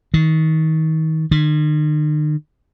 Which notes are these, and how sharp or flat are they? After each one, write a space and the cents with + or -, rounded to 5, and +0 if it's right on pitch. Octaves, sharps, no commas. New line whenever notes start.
D#3 +30
D#3 -45